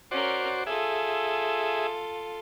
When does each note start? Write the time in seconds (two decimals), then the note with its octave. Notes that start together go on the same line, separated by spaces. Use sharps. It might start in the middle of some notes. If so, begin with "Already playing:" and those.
0.11 C#4 F#4 A#4 C5 D5
0.67 F4 G#4 A4 E5